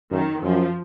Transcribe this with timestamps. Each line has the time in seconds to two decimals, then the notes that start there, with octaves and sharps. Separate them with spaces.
0.11 F#2 D#3
0.43 F#2 F3